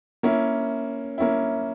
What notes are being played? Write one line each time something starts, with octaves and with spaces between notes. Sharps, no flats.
A#3 C#4 E4
A#3 C#4 E4